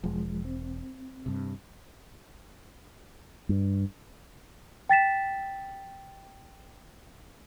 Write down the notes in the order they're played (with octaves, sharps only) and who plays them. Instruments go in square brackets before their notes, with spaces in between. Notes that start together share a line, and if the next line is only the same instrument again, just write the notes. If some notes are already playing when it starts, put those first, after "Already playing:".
[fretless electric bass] E1 [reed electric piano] F3 G#3
[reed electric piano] C4
[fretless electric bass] G2 C3
[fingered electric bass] G2
[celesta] G5 A6 B6 E7